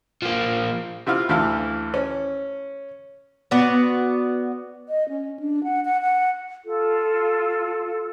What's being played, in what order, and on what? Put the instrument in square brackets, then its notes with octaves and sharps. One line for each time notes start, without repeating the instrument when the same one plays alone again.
[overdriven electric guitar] F3 A#3
[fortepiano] C3 E4 F4 F5
D2 E3 E4 F5
C#4
[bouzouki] B3 F#4 D5
[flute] D#5
C#4
D4
F#5
F#5
F#5
[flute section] F4 A4